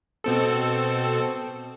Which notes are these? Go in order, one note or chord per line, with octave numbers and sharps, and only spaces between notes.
B2 C4 A4